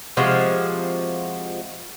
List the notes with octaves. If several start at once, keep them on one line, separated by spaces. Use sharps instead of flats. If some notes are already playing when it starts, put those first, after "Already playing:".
C3 F3 G#3 F#4